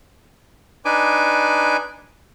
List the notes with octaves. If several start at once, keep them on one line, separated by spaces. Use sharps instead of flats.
D4 D#4 B4 G#5 D6